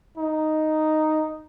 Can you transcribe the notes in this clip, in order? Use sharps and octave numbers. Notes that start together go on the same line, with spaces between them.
D#4